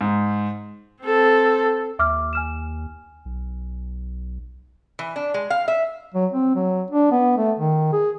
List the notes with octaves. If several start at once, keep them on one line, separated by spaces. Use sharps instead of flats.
G#2
C4 A4
D#2 E5 D6 F6
G#5 F6 E7
B1
E3
D4
G#3
F5
E5
F#3
C4
F#3
D4
B3
A3
D#3
G#4